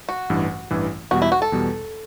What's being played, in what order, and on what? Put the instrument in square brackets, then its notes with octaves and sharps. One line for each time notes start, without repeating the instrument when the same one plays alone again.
[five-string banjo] F#4
[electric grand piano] A1 G2 E3
A1 G2 E3
[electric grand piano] E2 B2 G3 [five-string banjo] F#4
[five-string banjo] E4
F#4
A4
[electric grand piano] E2 B2 G3